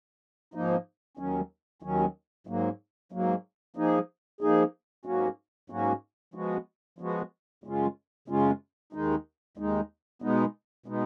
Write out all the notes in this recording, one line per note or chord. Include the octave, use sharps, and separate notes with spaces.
G#2 F3 A#3 D#4
D#2 D#3 F#3 C#4
D#2 D#3 F#3 C#4
G#2 F#3 A#3
G#2 F#3 A#3
F3 A#3 D#4 G#4
F3 A#3 D#4 G#4
G#2 F#3 A#3 C#4 F#4
G#2 F#3 A#3 C#4 F#4
F3 G#3 B3 F#4
F3 G#3 B3 F#4
F#2 C#3 G#3 C#4 F4
F#2 C#3 G#3 C#4 F4
D#2 D#3 G#3 D#4
D#2 D#3 G#3 D#4
B2 G#3 B3 D#4
B2 G#3 B3 D#4